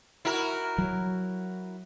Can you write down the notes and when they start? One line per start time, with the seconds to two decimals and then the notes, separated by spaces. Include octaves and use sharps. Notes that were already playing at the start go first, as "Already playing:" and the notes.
0.25 E4 F#4 A#4
0.78 F#3